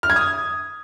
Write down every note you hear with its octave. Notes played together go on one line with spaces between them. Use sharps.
F6
G#6
D#6